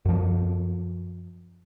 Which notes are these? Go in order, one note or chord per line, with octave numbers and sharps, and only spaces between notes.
F#2 F3